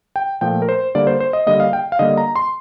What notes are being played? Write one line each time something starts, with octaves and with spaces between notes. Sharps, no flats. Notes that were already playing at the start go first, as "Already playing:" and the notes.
G5
A#2 F3 A3 G5
A#4
C5
D3 G3 A#3 D5
C5
C5
D#5
D3 G3 A#3 D#5
F5
G5
F5
D3 G3 A#3 D#5
A#5
C6